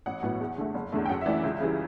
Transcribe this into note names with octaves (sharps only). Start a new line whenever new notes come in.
A1 F#5
A2 F#3 B3
E2
D3 A3
F#1
E2 D3 A3
G5
F#2 F#5
E5
E3 A3 D5
E5
C#2
C#3 E3 G3